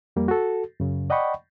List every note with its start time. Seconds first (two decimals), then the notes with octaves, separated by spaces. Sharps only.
0.16 F2 G3 A#3
0.28 F#4 A4
0.80 F#2 C#3
1.10 D5 D#5 F#5 G5 B5 C#6